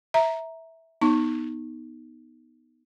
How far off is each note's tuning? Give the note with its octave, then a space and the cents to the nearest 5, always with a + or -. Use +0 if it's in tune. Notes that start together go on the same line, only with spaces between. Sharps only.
E5 -10 A#5 +0
B3 -10 D#4 +0 C#6 -20